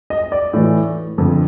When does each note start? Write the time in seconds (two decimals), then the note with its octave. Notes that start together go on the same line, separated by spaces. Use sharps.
0.10 D#5
0.32 D5
0.53 A2 E3
1.18 F2 D3